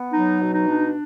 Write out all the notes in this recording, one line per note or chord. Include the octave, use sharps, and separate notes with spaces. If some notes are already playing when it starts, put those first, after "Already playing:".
Already playing: B3
F#3 D#4
B2
D#4
D4